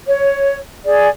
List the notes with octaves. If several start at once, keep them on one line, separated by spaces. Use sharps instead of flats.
C#5
G#4 D5